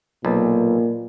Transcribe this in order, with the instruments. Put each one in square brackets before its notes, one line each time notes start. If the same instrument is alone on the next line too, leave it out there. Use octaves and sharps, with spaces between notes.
[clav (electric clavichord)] B1 [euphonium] A#2